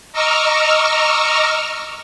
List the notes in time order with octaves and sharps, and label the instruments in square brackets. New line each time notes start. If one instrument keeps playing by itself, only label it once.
[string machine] D#5 A#5 C#6 D6 E6 F6